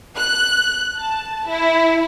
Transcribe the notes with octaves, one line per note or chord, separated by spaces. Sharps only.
F#6
A5
E4